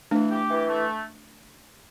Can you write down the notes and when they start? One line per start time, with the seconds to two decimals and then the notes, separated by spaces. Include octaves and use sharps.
0.11 E3 A3 D4
0.30 G4
0.50 E3
0.68 A3